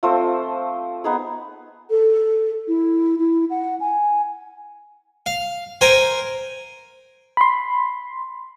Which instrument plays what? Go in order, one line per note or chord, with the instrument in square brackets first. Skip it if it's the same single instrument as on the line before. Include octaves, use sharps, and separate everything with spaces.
[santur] F3 A3 C4 C5
B3 D#4 G#4
[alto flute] A4
E4
E4
F#5
G#5
[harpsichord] F5
A#4 C5 G5 G#5
[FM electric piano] B5 C6